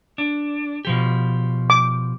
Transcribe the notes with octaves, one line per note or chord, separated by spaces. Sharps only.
D4
B2 F3 G4
D6